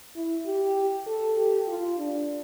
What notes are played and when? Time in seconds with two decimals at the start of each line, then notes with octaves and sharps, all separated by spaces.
0.16 E4
0.46 G4
1.07 A4
1.37 G4
1.68 F4
1.98 D4